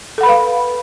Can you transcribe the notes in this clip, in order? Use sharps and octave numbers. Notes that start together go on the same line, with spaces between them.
A4 B4 F5 F#5 B5